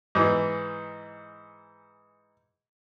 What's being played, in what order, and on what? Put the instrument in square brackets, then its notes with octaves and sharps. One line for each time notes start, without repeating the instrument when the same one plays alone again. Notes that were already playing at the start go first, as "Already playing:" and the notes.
[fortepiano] G#2 E3